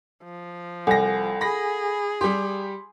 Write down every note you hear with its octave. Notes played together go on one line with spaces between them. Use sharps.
F3
C2 A4 F#5 G#5 A#6
G#4 B5 A#6
G3 G4 C6